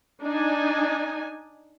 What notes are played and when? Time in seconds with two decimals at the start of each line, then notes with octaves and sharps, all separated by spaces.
0.22 D4 D#4 G#5